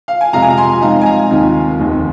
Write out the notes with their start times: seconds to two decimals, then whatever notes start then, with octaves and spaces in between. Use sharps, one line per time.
0.08 F5
0.21 G#5
0.33 F2 C3 F3 G#3 F5 A#5
0.42 G#5
0.50 A#5
0.57 G#5 C6
0.81 G#2 F3 C4 D#4 F5 A#5
1.01 G#5
1.06 F5 A#5
1.30 D#2 D#3 C4 F4
1.79 F1 D#2 D#3 C4